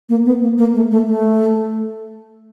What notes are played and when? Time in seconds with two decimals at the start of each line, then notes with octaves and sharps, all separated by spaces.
0.09 A#3
0.26 B3
0.41 A#3
0.58 A#3
0.74 A3
0.91 A3
1.07 A3